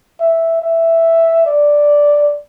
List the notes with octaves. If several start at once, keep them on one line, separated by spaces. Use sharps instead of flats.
E5
E5
D5